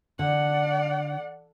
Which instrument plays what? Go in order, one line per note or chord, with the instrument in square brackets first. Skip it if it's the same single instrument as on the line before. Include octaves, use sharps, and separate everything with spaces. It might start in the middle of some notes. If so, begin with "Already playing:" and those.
[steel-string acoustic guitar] D3 [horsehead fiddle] D5 F#5